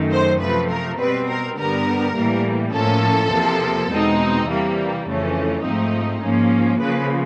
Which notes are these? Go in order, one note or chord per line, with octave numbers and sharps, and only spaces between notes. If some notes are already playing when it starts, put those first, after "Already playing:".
Already playing: F#2 D#3 F#3 A3
C5
C3 F3 A3 B4
A#4
B2 G3 C4 B4
A#4
G2 D3 G3 B3 A#4
A2 E3 G3 A#3
A2 F3 A#3 C#4 A4
E2 C3 F3 A#3
E2 B2 G#3 C4 D#4
C3 E3 G3 A#3
F2 C#3 E3 A3 C#4
G#2 F3 A3 C4 D#4
G#2 F3 A#3 C#4
C#3 F3 A#3 B4